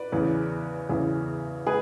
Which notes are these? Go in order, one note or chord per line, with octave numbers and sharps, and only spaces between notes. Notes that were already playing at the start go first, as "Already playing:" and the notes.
Already playing: B4 D5
E2 C#3 E3
E2 C#3 E3
G#3 G#4 B4